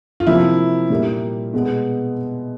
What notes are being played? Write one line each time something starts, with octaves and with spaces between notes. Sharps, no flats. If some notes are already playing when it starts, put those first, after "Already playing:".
F4
C3 F3 A#3 E4
A#2 G3 A#3
B2 G#3 B3